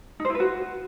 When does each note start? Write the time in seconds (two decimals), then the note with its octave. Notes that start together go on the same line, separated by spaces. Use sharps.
0.20 D#4
0.25 C5
0.30 E4
0.35 B4
0.40 F#4